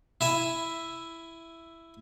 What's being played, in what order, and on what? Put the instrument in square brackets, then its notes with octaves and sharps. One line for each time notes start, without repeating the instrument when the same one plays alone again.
[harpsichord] E4 E5 G#5